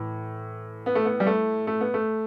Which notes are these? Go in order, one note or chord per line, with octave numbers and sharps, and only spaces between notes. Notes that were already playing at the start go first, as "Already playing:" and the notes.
Already playing: A2 E3
B3
A3
B3
G3
A3
A3
B3
A3